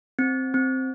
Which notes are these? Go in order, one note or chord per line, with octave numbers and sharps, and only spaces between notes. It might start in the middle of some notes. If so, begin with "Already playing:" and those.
C4
C4